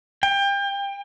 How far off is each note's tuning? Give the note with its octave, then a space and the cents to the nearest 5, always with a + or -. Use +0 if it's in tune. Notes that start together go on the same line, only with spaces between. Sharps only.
G5 +30